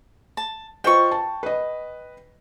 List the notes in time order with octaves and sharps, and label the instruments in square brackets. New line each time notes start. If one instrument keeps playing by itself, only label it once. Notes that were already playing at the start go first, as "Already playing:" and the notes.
[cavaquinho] A5
[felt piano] F4 C5 D#5 [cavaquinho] G5 C#6
[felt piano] A5
B4 D#5